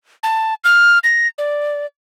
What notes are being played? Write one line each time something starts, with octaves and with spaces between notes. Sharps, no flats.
A5
F6
A#6
D5